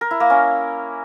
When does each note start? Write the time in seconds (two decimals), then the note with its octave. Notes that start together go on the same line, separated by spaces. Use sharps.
0.01 A#4
0.11 E4
0.20 A#3
0.30 C#4